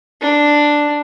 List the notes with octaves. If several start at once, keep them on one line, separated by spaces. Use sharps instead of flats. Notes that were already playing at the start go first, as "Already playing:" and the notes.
D4